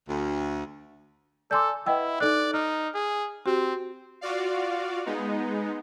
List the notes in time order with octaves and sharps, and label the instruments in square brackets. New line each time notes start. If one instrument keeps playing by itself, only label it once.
[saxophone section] D2
[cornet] A4 [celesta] D5 G#5 C6 [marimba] D6 E6 G6
[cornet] E4 [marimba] B4 G5 [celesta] D#5 F#5 E6
[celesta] D#4 A4 F#6 [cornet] D5
[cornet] D#4 [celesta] F6
[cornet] G#4
[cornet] C4 [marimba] F#4 G4
[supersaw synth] F4 F#4 D5 F5
G#3 B3 D#4